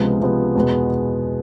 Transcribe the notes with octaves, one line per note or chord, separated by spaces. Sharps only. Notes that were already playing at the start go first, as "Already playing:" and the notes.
Already playing: C#2 C3 F3 G#3 B3
C#2 C3 F3 G#3 B3
E2 B2 G#3 B3